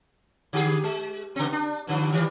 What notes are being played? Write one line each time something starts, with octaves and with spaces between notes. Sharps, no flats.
D3 G4 G#4
G#3
C#3 C4
D4
G2 D3 F3
D#3 E3 G3